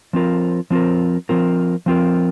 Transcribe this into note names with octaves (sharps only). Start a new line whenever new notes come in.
F3 C4 F4 A#4
F3 C4 F4 A#4
F3 C4 F4 A#4
F3 C4 F4 A#4